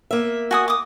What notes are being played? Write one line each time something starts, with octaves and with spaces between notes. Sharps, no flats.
A#3 E5
F#4 G#5 D#6
D6 D#6